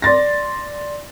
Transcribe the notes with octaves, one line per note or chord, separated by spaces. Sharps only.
D5 C6 A6 A#6